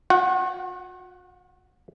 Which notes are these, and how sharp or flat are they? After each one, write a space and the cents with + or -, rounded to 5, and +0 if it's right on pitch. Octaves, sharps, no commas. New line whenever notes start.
F#4 -45 F#5 +15